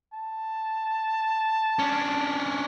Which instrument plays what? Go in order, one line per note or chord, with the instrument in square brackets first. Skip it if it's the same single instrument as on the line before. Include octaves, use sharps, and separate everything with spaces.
[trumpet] A5
[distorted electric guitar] C#4 D4